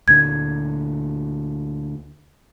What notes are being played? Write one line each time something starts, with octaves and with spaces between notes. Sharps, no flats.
D2 A#2 D3 G#6